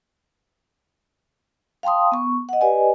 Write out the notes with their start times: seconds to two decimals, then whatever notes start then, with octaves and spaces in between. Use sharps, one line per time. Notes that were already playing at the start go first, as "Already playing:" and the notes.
1.83 F5 G5 A5 C6 D#6
2.12 B3 C#6
2.49 D#5 F#5
2.61 G4 B4 D5 D#5 G#5